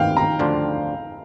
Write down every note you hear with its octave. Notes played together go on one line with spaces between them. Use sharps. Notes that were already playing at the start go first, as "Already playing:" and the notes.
Already playing: D2 C3 A#3 F5 G5
A#5
D2 D3 F3 D4 F4